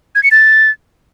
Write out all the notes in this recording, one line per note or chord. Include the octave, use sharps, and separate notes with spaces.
G#6
C#7
A6